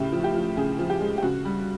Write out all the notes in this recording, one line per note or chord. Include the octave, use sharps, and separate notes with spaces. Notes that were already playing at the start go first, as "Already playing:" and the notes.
Already playing: A2 C#3 G4
F3
G4
F3
C#3 G#4
F3
G4
G#3
G4
C#3 F#4
G3